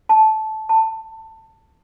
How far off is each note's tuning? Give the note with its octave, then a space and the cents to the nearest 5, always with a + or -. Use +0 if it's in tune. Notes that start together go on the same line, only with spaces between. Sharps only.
A5 -15
A5 +20